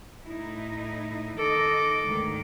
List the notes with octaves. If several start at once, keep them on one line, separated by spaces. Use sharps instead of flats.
A2 D#4 E4
D#3 D#4 A4 D#5 D6
D2 G#2 D#3